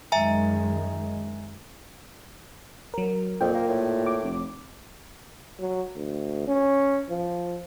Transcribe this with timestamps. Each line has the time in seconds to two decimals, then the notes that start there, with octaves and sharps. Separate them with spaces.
0.12 F#2 D#3 G#3 E5 G#5 A#5
2.94 F#3 A#4
3.41 F2 A#2 G5
3.54 A#3
3.68 A2
4.06 D6
4.23 F1
5.60 F#3
5.96 D2
6.48 C#4
7.10 F3